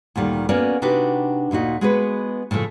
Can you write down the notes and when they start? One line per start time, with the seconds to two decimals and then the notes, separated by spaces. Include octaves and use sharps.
0.16 D2 A#2 D#3 G3
0.49 A#3 B3 C#4 F#4 A#4 D5
0.82 C3 D4 D#4 F#4 G4 B4
1.51 D2 A#2 D#4 F#4
1.81 G#3 B3 F#4 G#4 B4
2.51 A2 C#3 F3 A3